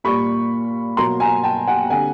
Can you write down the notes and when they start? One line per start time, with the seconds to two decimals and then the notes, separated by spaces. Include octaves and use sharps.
0.04 A#2 G3 A#3 B5 C#6
0.97 B2 F#3 A#3 A#5 C6
1.20 G#5 A#5
1.44 G5 A5
1.67 F#5 G#5
1.90 D3 G3 C4 F#5 G#5